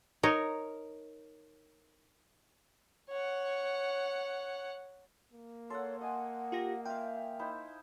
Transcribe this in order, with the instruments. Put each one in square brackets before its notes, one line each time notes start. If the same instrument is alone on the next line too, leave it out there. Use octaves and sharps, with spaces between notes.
[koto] D#4 [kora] A#4 C#5
[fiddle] C#5 F#5
[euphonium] A#3
[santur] A4 F#5 [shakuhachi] C#5 [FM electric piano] C6
[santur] D#5 G#5 [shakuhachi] F#5
[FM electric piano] F4 G4 A#6
[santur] F4 F5 [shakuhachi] E5 [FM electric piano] G5
[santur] D#4 E4 C5